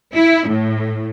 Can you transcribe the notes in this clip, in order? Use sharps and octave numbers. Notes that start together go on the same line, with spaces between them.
E4
A2